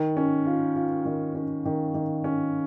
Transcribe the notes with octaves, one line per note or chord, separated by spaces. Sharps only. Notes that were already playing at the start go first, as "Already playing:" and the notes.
Already playing: D#3
C#4
F4
F4
D#3
C#4
D#3
D#3
C#4